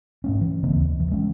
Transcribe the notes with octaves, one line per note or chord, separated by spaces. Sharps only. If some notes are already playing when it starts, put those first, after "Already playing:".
G#2 A3 C#4
E3
C#3 A#3 C4
D#2
E3
G#3 C#4